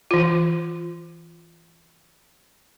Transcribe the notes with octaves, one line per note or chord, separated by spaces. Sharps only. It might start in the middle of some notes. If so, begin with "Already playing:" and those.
E3 F4